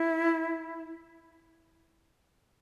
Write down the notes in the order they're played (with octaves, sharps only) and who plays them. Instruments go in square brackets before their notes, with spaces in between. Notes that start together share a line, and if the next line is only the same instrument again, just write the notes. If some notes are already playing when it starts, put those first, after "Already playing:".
Already playing: [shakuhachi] E4